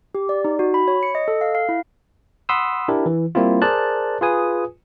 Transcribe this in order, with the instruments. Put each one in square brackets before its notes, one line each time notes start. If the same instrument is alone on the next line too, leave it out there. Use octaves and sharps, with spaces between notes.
[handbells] G4
D5
D#4
F#4
B5
C#5
C#7
D#5
A4
F5
F5
E4
[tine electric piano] F#5 B5 C6 D#6 E6
D4 E4 G4 A#4
E3
G3 A#3 C4 E4 F4
G#4 A#4 C5 D5 A5 F#6
F4 G#4 B4 G#5 D#6